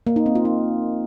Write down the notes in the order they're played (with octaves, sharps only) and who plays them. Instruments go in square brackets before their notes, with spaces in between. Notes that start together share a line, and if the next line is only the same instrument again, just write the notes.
[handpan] A#3
D#4
C4
F4
D#4